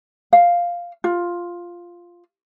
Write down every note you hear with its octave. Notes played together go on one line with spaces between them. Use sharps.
F5
F4